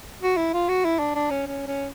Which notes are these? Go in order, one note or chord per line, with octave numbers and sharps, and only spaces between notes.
F#4
E4
F4
F#4
E4
D4
D4
C#4
C#4
C#4